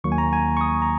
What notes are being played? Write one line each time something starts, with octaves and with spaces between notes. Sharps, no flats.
D#2 D#3 F#3 A#3 C#6
G#5
A#5
G#5
C#6
D#6
A#5